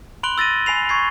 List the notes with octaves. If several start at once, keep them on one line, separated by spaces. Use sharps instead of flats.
B5 C6 F#6 D7 F#7 G7
E6 A6 A#6 D#7
G#5 B5 C7 F7
C#6 G#6 C7